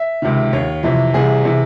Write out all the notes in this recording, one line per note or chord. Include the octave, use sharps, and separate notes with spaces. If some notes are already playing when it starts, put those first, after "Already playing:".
Already playing: E5
C#2 C3 D#3
D#2 D#3 C#5
F2 C3 E3
C2 C3 E3 G#4
C3 E3